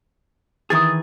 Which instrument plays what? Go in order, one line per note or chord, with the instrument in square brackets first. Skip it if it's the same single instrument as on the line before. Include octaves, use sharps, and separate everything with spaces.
[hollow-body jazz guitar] D#3 E3 G#4 [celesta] D#6 A6